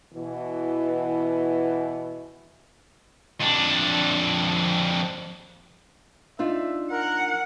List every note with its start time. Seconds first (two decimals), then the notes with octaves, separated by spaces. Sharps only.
0.14 B2 E3
3.41 F2 D4
6.39 D4 D#4 F4 E5
6.92 A#4 F#5